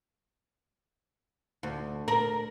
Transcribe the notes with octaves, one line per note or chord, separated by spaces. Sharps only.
D2
A#4